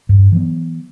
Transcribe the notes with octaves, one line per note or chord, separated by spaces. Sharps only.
G2
E3 F#3 B3